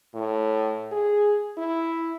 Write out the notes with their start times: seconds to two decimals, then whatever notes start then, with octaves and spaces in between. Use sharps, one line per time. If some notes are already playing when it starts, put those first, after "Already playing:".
0.14 A2
0.92 G#4
1.58 E4